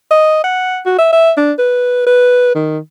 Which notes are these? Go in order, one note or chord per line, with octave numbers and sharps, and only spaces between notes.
D#5
F#5
F#4
E5
E5
D4
B4
B4
D#3